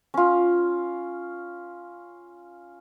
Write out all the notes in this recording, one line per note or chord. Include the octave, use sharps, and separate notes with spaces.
C#4 F4